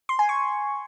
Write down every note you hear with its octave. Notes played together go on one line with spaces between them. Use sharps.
C6
G#5
C#6